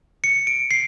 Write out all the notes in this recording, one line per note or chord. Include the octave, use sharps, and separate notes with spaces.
C#7
D7
C7